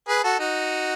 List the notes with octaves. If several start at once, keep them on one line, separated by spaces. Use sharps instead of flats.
G#4 B4
F#4 A4
D#4 F#4